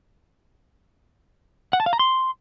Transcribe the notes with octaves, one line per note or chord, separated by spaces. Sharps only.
F#5
A5
F5
A#5
C6